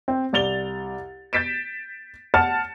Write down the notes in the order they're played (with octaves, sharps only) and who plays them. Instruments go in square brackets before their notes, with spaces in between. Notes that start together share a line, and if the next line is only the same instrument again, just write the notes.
[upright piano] C4
C2 D5 A6 F7 G7
G6 A6 B6 D7 E7
F#5 A5 F6 A6 C#7 E7